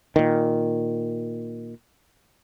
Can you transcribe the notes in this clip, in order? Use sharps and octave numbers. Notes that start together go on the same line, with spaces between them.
A#2 D#3